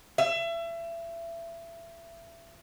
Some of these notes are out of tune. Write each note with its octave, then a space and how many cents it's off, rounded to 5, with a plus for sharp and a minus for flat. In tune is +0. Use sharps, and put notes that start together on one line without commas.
E5 +30